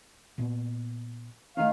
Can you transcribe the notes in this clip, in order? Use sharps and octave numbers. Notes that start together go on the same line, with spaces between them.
A#2 B3
D#3 A3 C#4 F5